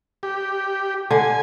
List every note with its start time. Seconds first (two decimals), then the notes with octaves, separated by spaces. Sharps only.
0.23 G4
1.11 D3 G#5